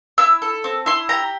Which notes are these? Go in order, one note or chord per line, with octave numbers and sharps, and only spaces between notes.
E4 E6
A4
C4
E4 C6
G4 A#5